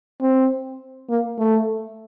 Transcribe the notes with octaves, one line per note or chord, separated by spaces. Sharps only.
C4
A#3
A3